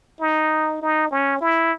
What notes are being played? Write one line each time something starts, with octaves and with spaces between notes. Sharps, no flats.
D#4
D#4
C#4
E4